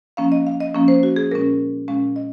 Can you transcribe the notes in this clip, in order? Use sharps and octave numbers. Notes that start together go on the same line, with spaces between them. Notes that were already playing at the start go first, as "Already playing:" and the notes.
F3 A#3 C#4 F5
D#5
F5
D#5
F3 A#3 C#4
C5
F#4
G#4
A#2 G#3 C#4 A#4
A#2 G#3 C#4 F5
D#5